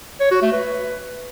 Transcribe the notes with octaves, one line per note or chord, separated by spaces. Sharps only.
C#5
F#4
A3
B4